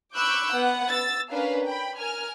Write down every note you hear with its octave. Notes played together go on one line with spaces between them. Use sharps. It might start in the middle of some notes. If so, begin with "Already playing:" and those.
B5 C#6 D6 E6 F#6 G6
B3 F#5
E6 A6
C#4 D4 A#4 B4 F5
G5 B5
A#4 G#5 F6